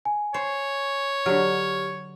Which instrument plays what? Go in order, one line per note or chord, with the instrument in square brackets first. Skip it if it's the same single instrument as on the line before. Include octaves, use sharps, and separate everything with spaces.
[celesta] G#5
[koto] C5 [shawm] C#5
[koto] D3 F#3 [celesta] G4 F6